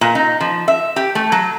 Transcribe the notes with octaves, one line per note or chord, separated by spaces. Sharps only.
A#2
D#4
F3
E5
G4
A3
F#3